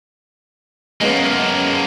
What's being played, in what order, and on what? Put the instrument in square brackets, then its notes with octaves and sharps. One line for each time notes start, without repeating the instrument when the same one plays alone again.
[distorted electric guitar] F#2 A#3 [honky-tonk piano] G#3 B3 C#4